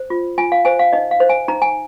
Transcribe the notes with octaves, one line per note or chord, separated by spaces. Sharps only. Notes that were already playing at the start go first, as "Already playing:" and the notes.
Already playing: C5
F4
F4 G#5
F5
C5 G#5
F5
D#4 D#5
F5
C5
G#5
D#4 A#5
G#5